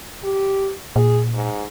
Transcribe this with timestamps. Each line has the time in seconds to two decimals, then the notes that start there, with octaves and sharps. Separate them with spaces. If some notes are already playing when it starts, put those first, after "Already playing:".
0.23 G4
0.96 A#2 G#4
1.34 G#2